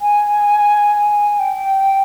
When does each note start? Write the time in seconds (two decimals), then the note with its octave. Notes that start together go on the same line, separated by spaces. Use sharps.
0.01 G#5
1.39 G5